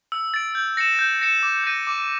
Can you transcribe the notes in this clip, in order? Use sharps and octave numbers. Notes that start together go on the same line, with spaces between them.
E6
A6 D7
G6
A#6 C#7 E7
G6
A#6 C#7 E7
D6
G6 A#6 D#7
D6